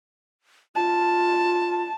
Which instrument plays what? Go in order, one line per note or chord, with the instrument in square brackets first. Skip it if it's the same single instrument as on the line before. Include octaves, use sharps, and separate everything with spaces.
[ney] F4 [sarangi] A5